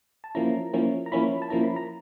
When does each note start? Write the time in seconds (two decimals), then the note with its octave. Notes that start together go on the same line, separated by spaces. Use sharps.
0.24 A5
0.35 F3 A#3 C#4 E4 A#5
0.73 F3 A#3 C#4 E4
1.06 A#5
1.12 F3 A#3 C#4 E4 B5
1.42 A5
1.50 F3 A#3 C#4 E4 A#5
1.64 B5
1.76 A#5